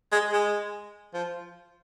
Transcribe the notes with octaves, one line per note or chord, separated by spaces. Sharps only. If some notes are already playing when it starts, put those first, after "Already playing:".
G#3
G#3
F3